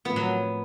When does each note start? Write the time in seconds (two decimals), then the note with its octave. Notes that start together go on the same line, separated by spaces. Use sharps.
0.05 A2 F3 A3 B3 C4 F4
0.16 F#3